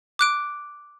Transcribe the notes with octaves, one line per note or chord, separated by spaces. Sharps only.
D6 F#6 D7